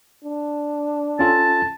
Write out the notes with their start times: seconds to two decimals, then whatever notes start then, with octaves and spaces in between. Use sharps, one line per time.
0.24 D4
1.19 C#4 F4 A4 A5